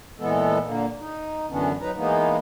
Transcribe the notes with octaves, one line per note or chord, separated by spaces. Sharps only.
A#2 E3 G#3 B3 A4
A#2 D3 A#3
D#4
F#2 D3 E3 B3 C#4 D4
F#3 D#4 B4 A#5
E3 G#3 A#3 B3 D#4